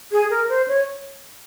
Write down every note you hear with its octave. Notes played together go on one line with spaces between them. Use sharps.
G#4
A#4
C5
C#5